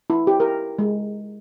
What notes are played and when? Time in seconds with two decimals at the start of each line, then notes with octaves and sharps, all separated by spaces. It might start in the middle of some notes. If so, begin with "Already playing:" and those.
0.10 E4
0.27 G4
0.40 A#4
0.79 G#3